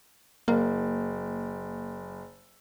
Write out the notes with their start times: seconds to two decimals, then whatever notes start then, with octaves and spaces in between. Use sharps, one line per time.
0.48 F#1 A#3